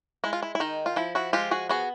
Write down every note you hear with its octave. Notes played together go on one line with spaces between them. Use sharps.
G#3 E4
F4
E4
E4
D#3 D#4
F4
F3 E4
E4 F#4
G#3 F4 G4
F#4 G#4
B3 F#4 G#4